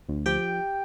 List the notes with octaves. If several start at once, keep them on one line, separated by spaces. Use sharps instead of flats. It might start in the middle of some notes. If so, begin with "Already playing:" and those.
D2
F3 G4 G5